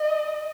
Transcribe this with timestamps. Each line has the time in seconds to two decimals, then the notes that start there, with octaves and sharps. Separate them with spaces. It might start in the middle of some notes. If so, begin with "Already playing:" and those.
Already playing: D#5